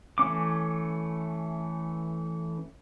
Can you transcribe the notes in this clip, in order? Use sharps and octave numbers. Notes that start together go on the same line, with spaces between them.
E3 A3 C#4 D6